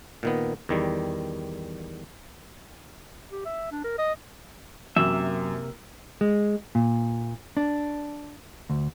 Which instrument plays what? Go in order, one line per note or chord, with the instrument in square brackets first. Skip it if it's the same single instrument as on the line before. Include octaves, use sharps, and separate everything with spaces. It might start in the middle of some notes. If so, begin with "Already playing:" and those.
[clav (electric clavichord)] A#2 D#3 B3
E2 D#3 G3
[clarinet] G4
E5
D4
A#4
D#5
[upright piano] F#2 [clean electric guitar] C3 A#3 E5
[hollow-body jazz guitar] G#3
A#2
D4
D2